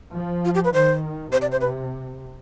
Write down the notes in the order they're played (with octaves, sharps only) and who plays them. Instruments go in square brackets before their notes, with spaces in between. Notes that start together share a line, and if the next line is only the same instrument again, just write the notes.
[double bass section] F3
[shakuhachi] F4
G4
B4
[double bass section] D#3 [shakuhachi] C5
[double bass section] C3 [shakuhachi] C5
[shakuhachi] D5
C5
B4